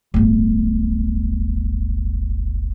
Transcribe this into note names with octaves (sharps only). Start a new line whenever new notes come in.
D1 G1